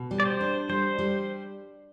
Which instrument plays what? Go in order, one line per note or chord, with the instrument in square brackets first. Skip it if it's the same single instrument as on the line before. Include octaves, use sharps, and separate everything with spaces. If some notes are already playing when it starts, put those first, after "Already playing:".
Already playing: [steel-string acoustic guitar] B2
G3
[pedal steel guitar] D5
C5
[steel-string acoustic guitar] D4
[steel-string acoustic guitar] G3 [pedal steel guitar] C5
[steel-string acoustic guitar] G3